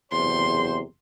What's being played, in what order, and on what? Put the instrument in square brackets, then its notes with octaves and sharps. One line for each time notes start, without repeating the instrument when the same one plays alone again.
[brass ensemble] F#1 C3 C5 [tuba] E2 [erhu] C6